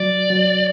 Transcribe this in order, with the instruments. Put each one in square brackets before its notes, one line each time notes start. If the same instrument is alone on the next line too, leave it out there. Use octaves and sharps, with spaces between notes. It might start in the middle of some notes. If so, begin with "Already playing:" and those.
Already playing: [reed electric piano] F#3 [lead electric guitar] D5
[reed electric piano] F#3